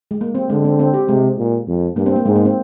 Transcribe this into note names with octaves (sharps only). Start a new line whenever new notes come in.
G#3
A#3
C4
D3 G#3
C4
C4
G4
C3 G#3
A#2
F2
G2 A#3
C4
A#3
G#2 G#3
A#3
C4